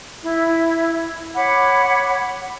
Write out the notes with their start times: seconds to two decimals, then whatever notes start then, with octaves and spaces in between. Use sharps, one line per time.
0.22 E4
1.35 C#5 F#5 B5 D6